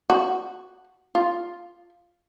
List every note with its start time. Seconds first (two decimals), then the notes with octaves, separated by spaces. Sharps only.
0.10 F#4
1.15 F4